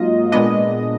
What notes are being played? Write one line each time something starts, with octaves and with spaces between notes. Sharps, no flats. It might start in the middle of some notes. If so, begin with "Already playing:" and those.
Already playing: G#2 F#3 A#3 F4 D#5
A#2 G#3 B3 D4 D#5